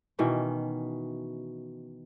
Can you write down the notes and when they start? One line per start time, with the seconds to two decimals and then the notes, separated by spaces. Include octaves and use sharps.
0.19 B2 D#3 E3 C#4